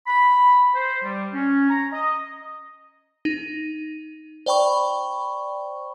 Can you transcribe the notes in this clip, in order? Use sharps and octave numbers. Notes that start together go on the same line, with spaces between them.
B5
C5
G3
C#4
A#5
D#5
D#4
C5 D5 G5 B5 C#6